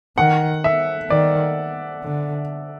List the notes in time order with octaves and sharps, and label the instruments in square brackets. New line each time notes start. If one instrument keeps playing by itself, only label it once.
[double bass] D#3 [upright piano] F#5
[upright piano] E5
[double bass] D#3 [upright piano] D5
[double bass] D3